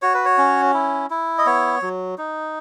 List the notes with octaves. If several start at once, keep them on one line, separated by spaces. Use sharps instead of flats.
F#4 C#5
B4
C#5
C#4
E4
E4
D#5
B3 C#5
F#3
D#4